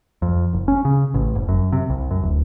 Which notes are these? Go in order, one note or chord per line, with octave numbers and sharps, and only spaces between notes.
F2
F#1
C#4
C#3
A1
F#1
F#2
C3
C2
F#2
D1